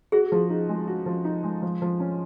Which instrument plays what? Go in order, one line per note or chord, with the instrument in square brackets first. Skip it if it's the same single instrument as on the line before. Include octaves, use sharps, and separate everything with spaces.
[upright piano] F#4 [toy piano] G#4
[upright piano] F3
D#4
G#3
F#4
F3
D#4
G#3
F3
F3
C#4